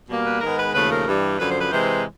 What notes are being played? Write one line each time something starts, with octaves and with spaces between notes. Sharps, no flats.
B2 G3 A#3
B4
G#2 D#3 G#3 B3 A#4
B4
D#2 C#3 F3 A3 B4
A#4
G2 E3 G3
F#2 D3 F3 B4
C5
B4
C3 E3 G#3 C5